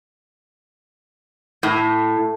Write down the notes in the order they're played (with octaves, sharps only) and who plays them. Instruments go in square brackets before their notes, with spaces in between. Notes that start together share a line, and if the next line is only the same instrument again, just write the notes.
[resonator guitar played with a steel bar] A2